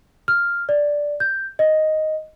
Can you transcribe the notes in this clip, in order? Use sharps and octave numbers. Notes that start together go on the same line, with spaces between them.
F6
D5
G6
D#5